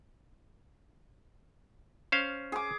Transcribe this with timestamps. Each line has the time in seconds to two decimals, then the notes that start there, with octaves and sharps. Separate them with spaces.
2.12 C#4 C5 F5
2.52 G#4 D6